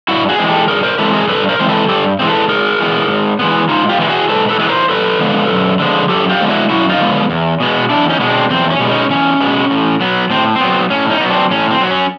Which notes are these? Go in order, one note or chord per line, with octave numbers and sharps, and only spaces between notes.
G2 E4 F#4
F#4 G#4
E3 G#3 C4
G4 A4
G2 G#4 A#4
A#4 C5
E3 G#3 C4 A4 B4
G#4 A#4
G2 A4 B4
A#4 C5
E3 G#3 C4 C5
A4 B4
G2 G4 A4
E3 G#3 C4
A4 B4
G#2 G#4 A#4
E3 G#3 B3
G#2
E3 G#3 B3
G#2 D#4 F4
F4 G4
E3 G#3 B3
F#4 G#4
G#2 A4 B4
A4 B4
E3 G#3 B3
A#4 C5
F#2 A4 B4
D3 F3 G#3 B3
F#2
D3 F3 G#3 B3
F#2 G4 A4
F4 G4
D3 F3 G#3 B3
E4 F#4
F#2 E4 F#4
D#4 F4
D3 F3 G#3 B3
E2
B2 G#3 B3
E2 D4 E4
C#4 D#4
B2 G#3 B3
C4 D4
E2 C4
C#4
B2 G#3 B3
C#4 D#4
E2 C#4
B2 G#3 B3
A2
F#3 B3
A2 C4
C4
F#3 B3
A2 C#4
C#4 D#4
F#3 B3
C4 D4
A2 C#4
C4
F#3
B3
C#4